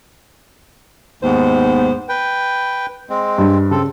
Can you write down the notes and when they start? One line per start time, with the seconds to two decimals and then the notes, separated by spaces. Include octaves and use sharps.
1.23 D#2 G#2 B3 C5
2.09 B4 G5
3.10 G#3 C4
3.38 G2
3.71 C#3 C4 A4